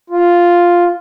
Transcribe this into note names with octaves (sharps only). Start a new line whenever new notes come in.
F4